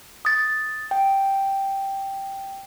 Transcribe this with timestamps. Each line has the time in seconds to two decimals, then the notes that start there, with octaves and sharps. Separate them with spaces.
0.25 D#6 A6
0.91 G5